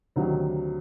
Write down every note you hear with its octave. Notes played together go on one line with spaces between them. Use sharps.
D2 C3 D#3 F#3